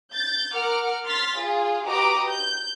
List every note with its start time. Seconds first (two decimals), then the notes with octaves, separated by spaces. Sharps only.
0.12 G6 A6
0.53 A#4 F#5 D6 F6
1.05 C6 F6 A6 B6
1.37 F4 G#4
1.86 F#4 G4 B4 D#5 A#5 D6
2.27 G6